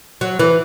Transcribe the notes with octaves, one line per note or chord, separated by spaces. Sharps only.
F#3
E3